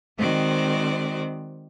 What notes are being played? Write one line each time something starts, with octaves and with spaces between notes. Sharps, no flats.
D#3 G#3 C4 F#4 C5 D5